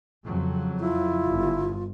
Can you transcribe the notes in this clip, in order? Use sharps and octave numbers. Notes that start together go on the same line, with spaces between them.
F2 C#3 F#3
E4 F4
G1